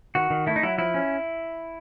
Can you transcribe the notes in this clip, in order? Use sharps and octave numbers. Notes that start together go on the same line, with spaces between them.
D#3 F#4
D#3
A3 E4
D#4
F#3 E4
F3 E4
C#4